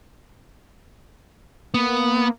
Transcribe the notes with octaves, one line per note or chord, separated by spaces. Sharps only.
A#3 B3